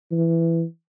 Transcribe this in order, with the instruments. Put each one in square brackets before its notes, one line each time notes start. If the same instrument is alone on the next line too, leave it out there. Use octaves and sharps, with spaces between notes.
[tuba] E3